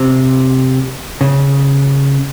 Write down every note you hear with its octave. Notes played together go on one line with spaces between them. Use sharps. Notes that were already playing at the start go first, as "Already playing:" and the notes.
Already playing: C3
C#3